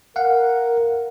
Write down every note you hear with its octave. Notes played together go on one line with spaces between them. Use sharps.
A#4 F5 F#5